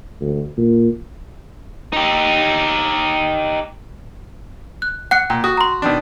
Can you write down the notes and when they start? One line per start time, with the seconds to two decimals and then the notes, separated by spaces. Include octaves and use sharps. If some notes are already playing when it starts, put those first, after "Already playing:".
0.21 D2
0.57 A#2
1.93 D#4 G4
4.82 F#6
5.11 F#5 F#6 C#7
5.30 A#2 G5
5.44 F#4 D#6
5.57 A#5 C6
5.82 B2 D#3 D4